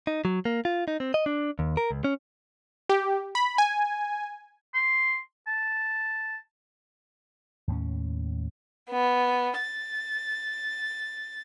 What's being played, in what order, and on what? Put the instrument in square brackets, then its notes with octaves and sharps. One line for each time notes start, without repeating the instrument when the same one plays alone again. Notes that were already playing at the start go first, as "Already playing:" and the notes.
[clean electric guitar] D#4
F#3
A#3
F4
D#4
C4
D#5
D4
D#2
A#4
C#2
C#4
[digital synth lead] G4
B5
G#5
[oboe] C6
A5
[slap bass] D#2 A2 C#4
[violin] B3
A6